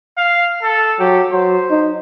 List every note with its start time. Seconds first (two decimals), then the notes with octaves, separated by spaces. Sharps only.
0.18 F5
0.62 A4
1.00 F#3 G4
1.32 F#3 C5
1.70 D#4